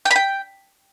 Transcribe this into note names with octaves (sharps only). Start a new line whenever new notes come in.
G5
B5
G5